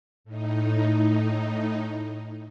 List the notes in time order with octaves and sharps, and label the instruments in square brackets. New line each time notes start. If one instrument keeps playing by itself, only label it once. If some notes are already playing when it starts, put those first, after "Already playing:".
[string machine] A2 D#4